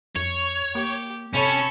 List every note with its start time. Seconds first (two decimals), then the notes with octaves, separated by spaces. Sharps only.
0.16 F2 C#5
0.75 A#3 G4
1.35 C3 C#4 A4 C#5 B5